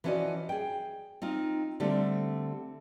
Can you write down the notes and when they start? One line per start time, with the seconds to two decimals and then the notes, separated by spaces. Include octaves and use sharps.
0.04 E3 F3 C#4 F#4 D5 D#5
0.49 G#4 G5
1.22 C4 D#4 F4
1.80 D3 G3 A3 C4